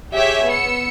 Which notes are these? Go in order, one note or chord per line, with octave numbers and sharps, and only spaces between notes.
G4 G#4 C#5 E5 G5
B3 E6 C#7